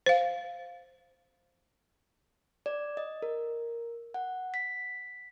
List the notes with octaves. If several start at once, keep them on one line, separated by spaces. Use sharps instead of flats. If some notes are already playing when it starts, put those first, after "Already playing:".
C5 F5
D5
D#5
A#4
F#5
B6